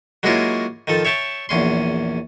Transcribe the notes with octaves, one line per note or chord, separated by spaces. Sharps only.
F#3 G#3 A#3 C#4 E4 F4
D#3 F3 A4
C#5 E5 G5 A5
A#1 E2 C#4 C6